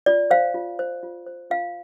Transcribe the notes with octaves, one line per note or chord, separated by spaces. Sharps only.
F4 D5
C5 F5
F4
C5
F4
C5
F4 F5